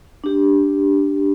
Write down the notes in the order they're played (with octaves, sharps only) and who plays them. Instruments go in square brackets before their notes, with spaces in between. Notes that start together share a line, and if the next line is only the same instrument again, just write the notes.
[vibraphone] D4 G4